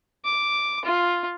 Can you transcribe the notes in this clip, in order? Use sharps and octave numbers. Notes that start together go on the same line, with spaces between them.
D6
F4